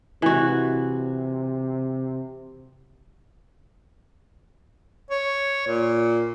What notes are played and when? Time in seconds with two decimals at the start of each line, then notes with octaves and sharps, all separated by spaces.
0.22 C3 E3 F#4
5.10 C#5
5.67 A#2